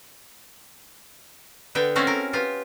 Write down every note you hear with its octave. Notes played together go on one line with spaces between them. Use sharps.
D3 B3 E5 G5
A3 C4 C#4 E4 F#4 F5
A#4
B3 F4 G4